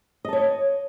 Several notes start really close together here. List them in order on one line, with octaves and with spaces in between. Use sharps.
D#5 A5 C#5